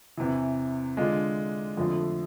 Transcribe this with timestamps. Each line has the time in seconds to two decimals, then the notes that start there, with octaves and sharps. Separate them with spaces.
0.17 E2 C3 E3
0.97 D3 G#3 D4 F4
1.77 F2 D3 F3 A3